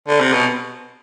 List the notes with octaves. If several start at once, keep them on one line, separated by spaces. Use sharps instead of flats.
D3
C3
B2